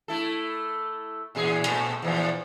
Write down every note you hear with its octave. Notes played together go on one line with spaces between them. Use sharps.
A3 E4 A4
E2 A#2 G#4
A#2 A3
E2 A#2 F3